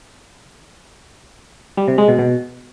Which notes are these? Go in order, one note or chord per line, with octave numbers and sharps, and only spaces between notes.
G3
C3
G#3
B2
B2